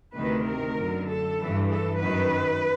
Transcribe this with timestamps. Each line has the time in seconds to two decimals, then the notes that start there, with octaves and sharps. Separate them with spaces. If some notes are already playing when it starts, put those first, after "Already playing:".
0.16 D2 C3 D#3 B4
0.47 A#4
0.77 F#2 D3
1.08 A4
1.39 G2 E3
1.70 A4
2.00 F#2 D#3 B4